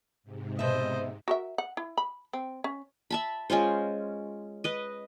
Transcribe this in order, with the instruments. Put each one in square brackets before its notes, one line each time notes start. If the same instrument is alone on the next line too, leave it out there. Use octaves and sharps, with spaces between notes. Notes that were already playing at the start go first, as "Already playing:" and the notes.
[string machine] G#2 C3
[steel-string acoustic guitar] B2 E5 [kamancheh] C5 D#5
[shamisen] F#4 A#4 E5
F#5
E4
B5
C4
C#4
[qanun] E5 A5 B5
G#3 C#4 F4 C5
B4 D#5